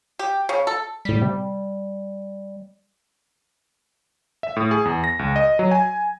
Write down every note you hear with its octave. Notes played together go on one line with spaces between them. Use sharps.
G4
C#3
A4
A2 G3 B6
C3
E5
A2
G#4
E2
A#6
C#2
D#5
F#3
G#5